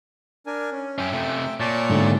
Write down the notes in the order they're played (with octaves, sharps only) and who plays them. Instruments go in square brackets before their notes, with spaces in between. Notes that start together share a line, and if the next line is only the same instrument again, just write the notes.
[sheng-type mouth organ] D4 A#4 G#5
C#4
[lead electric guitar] F#2 C#4 [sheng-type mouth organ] E5 G5
[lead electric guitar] C3 A3
[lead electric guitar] A#2 [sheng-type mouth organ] C#5 D5 A5
[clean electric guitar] G#2 D3 A3